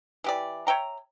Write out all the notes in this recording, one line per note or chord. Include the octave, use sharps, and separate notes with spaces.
E3 G4 D5
C#5 E5 G5 A#5